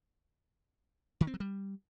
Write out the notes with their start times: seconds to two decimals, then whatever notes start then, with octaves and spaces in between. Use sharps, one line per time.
1.21 D#3
1.27 C4
1.34 F#3
1.40 G3